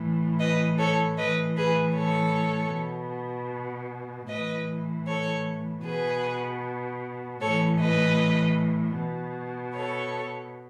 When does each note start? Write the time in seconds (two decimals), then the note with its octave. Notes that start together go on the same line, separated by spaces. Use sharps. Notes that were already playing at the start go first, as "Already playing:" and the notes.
Already playing: A2 E3
0.39 B4 D#5
0.78 A4 C#5
1.17 A2 E3 B4 D#5
1.57 G#4 B4
1.95 A4 C#5
2.73 B2
4.29 A2 E3 B4 D#5
5.07 A4 C#5
5.85 B2 G#4 B4
7.41 A2 E3 A4 C#5
7.80 B4 D#5
8.97 B2
9.75 A4 C#5